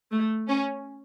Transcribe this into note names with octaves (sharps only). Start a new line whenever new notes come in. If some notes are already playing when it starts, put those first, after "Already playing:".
A3
C#4